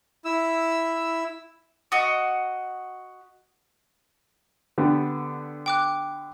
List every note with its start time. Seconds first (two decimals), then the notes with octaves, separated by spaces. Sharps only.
0.25 E4 E6
1.92 F#4 D#5
4.78 D3 B3 G4
5.66 G5 D6 F#6